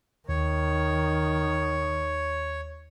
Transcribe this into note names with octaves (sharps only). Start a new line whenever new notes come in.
D#2 D#3 C#5